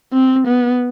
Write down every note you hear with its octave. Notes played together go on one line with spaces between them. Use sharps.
C4
B3